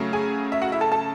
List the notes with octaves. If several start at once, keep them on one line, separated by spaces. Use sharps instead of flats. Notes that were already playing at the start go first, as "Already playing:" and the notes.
Already playing: C#3 F#3 A3
G#4 G#5
E5
F#4 F#5
E4 E5
A4 A5
A4 A5